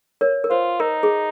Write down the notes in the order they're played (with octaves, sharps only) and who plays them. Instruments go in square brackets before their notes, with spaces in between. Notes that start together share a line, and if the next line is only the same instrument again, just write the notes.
[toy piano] A#4 C#5
A#4
[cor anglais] F4 [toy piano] C5
[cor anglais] D#4 [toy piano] A#4
[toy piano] G#4